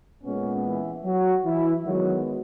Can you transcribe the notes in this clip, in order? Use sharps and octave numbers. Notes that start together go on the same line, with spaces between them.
A#2 G#3 B3 C#4
E3 E4
F#3 F#4
E3 E4
D#3 F#3 G#3 B3 F#4